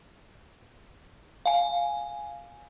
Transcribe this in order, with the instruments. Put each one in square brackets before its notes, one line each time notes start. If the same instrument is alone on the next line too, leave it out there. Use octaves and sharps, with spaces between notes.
[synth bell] F5 G#5